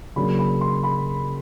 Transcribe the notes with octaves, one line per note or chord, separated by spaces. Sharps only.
C#3 F#3 A#3 D4 B5
B5
C6
B5